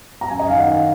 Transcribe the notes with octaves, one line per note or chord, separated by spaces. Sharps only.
A#5
F#2 G#5
D#5
D#3 F5
F#5
D#3 F5